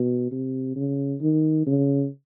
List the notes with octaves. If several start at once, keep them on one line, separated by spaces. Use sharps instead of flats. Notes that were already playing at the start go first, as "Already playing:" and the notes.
Already playing: B2
C3
C#3
D#3
C#3